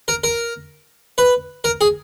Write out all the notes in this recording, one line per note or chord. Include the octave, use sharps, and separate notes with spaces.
A#4
A#4
B4
A#4
G#4